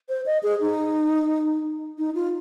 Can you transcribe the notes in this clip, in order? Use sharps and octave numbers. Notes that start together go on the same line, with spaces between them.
C5
D#5
G#4
D#4
D#4
F4